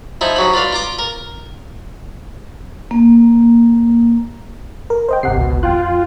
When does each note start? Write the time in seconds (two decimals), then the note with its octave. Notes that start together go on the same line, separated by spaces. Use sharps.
0.21 F3 D#4 E4
0.36 C#3 F#3 B5
0.53 F4 B4 D5 F5
0.73 F4 A#5 D6
0.99 A#4
2.91 A#3
4.90 A#4
5.09 C5 D#5 G5
5.23 G1 C3 F#5 C7
5.36 G#1 C#2 B2
5.63 F2 F4 G5 F#6